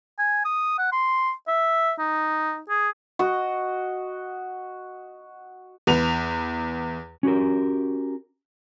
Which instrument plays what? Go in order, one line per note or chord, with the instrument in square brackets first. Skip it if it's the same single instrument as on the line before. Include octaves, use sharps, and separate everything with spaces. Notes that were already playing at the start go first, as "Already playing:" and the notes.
[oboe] G#5
D#6
F#5
C6
E5
D#4
G#4
[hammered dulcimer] F#4 D#5
[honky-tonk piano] E2 B4 F7
[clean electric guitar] C#4 F#4 G4 A#4